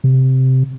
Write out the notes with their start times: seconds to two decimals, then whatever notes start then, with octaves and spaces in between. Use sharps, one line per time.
0.04 C3